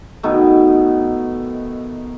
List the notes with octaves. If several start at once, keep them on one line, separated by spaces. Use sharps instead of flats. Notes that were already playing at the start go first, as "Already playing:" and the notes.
B2 D#3 A3